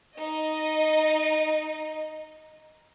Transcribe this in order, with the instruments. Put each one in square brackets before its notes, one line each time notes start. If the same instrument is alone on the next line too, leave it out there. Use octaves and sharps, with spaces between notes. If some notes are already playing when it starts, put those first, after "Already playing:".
[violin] D#4 D#5